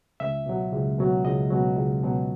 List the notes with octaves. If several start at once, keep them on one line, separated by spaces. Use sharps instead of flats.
C#2 E5
B2 F#3
C#2
B2 F#3
C#2 D#5
B2 F#3
C#2
B2 F#3